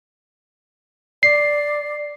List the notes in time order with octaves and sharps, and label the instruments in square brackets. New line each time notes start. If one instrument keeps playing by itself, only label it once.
[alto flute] D5 [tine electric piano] C7